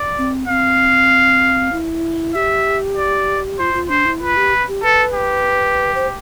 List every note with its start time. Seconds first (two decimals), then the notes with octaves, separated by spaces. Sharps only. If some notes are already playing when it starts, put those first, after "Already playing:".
Already playing: D5
0.18 C4
0.48 C4 F5
1.72 E4
2.34 G4 E5
2.97 D5
3.59 F4 C5
3.74 F4
3.90 D4 C5
4.06 E4
4.21 F4 B4
4.37 G4
4.68 G4
4.83 A4 B4
5.14 G4
5.95 C5